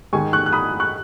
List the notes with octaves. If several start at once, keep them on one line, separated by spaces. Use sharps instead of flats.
G#2 D#3 G#3 G#5 C#6
C#6 F#6
F#6
B5 D#6
C#6 F#6